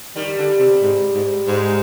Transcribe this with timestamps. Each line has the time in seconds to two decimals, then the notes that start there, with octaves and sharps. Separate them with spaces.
0.16 D#3 G3
0.38 D3
0.59 C3
0.82 G#2
1.14 G#2
1.47 G#2